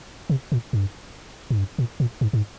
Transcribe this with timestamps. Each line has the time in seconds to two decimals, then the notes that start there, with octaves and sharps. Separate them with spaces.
0.30 C3
0.52 A#2
0.73 G2
1.50 G#2
1.58 G2
1.78 A#2
2.00 A#2
2.21 G#2
2.33 G#2